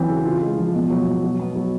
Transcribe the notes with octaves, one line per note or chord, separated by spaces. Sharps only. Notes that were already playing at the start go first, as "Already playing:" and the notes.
Already playing: E3 F#3 C4
C#3
F4
G#3
F3
B2
F#3
B2
F#3
B3
F#3